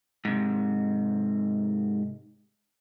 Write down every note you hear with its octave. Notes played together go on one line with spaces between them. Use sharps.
G#2 C3